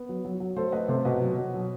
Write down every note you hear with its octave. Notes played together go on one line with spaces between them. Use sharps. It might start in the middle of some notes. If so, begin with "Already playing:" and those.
Already playing: B3
F#3
F#3
F#3
A3 A4 C5
A3 B4 D#5
C3 A4 C5
B2 B4 D#5
F#3
B2
F#3